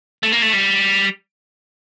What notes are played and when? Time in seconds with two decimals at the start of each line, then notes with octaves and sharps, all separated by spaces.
0.23 A3
0.32 A#3
0.42 A3
0.53 G3